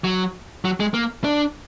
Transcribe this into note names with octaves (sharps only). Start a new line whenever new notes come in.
F#3
F#3
G#3
A#3
D4